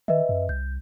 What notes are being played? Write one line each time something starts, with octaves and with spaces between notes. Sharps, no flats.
D#3 B4 D#5 E5
F#2
C2 G6